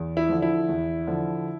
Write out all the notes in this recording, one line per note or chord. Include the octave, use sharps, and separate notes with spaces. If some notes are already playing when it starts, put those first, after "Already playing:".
Already playing: E2
E4
D3 F3
E4
E2
D3 F3